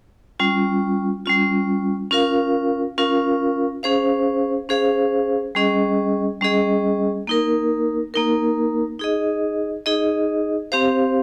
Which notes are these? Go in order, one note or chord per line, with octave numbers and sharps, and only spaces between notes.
G3 C#4 F4
G3 C#4 F4
C#4 F4 A#4 F5
C#4 F4 A#4 F5
C#4 G#4 C5 F5
C#4 G#4 C5 F5
G3 C#4 G#4 D#5
G3 C#4 G#4 D#5
A#3 D#4 A#4
A#3 D#4 A#4
D#4 G#4 D#5
D#4 G#4 D#5
C4 G4 C5 F5